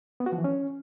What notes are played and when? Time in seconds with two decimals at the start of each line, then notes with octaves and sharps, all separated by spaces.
0.20 B3
0.26 F#4
0.32 F3
0.38 E3
0.44 C#4